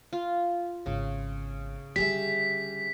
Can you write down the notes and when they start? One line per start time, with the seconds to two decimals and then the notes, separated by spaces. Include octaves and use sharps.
0.13 F4
0.86 G#1 C#3 B3
1.96 D3 G3 G4 G#4 E5 B6